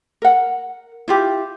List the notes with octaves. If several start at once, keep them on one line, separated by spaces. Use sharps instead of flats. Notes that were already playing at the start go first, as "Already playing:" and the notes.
A#4 F#5
E4 F4 G4